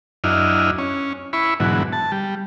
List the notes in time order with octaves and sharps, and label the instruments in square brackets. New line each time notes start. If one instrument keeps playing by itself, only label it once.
[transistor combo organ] F#2 D4 E4 D#5 F6
C#4
E4 B5 C#6
G#2 B2 D3 E3 F#3
A5
G3